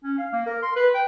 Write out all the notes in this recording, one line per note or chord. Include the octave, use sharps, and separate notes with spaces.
C#4
F5
A#3
A#4
C6
B4
G5